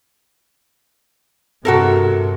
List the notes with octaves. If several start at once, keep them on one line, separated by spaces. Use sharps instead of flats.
G2 C3 F#4 A4 A#4